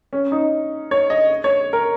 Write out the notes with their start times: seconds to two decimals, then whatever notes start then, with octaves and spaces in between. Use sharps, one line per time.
0.13 C#4
0.32 D#4
0.91 C#5
1.10 D#5
1.44 C#5
1.73 A#4